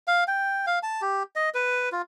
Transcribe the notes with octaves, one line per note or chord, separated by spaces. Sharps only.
F5
G5
F5
A5
G4
D#5
B4
F4